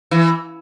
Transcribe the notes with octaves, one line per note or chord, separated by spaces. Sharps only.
E3